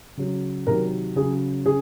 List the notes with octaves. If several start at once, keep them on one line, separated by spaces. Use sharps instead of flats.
C#3 F#3
C3 D#3 F#3 A#4
C#3 F#3 G#4
C#3 G#4